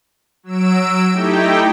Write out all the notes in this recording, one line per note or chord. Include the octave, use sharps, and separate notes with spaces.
F#3 E6 D7
A3 D#4 E4 G4 G5